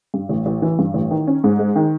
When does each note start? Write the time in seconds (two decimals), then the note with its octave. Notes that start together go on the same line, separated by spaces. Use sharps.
0.14 G2
0.29 A1
0.46 A1
0.62 E3
0.79 G2
0.94 A1
1.11 D#3
1.27 C#4
1.44 G#2
1.59 G#3
1.76 D#3